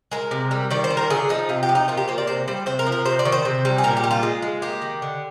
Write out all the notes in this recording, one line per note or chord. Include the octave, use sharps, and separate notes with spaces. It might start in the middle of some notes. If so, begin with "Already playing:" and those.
G#3 A#4
C3
G3
D#3 D5
C5
G3
A#4
D3 G#4
F3 D#4
C3 F4
G4
F3
D#4
A#3 F4
G4
A#3 C5
D5
C3 C5
G3 C5
C3 C5
A#4
F3
A#4
C3 C5
D5
D#3
C5
C3
G3
G#4
A#2 A#4
G4
G3
F4
G#3
G#3
A#3 G4
D#3
D3